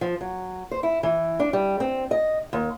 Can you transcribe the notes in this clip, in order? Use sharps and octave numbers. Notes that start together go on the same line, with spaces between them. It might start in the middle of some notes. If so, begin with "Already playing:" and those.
F3
F#3
C5
E4
E3
D4
G3
C4
D#5
D#2